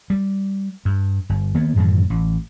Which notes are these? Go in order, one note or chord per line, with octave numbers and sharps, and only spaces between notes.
G3
G2
G1
D#3 A#3 B3
F#2 A2 D#3 E3
A1